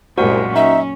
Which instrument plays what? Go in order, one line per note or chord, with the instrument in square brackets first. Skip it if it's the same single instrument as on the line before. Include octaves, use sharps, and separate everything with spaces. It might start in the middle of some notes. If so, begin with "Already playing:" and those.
[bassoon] C2 [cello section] F#2 A#2 G#3 [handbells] F#4 A#4 F#5
[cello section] C#4 [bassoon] D#4 [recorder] E5